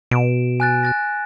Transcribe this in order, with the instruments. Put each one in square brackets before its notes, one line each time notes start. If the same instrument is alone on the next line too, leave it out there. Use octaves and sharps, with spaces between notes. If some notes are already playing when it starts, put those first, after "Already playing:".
[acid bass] B2 [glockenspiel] D7 E7
[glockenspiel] G#5 F#6 A6
F#6 A6 A#6